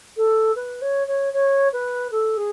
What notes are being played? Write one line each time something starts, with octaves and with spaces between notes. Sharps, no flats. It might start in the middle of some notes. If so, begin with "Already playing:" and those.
A4
B4
C#5
C#5
C#5
B4
A4
G#4